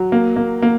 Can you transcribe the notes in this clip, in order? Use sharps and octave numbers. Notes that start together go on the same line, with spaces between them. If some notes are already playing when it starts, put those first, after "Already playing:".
Already playing: F#3
A#3
A#3
A#3